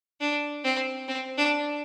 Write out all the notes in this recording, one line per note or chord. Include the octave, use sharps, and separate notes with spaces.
D4
C4
C4
D4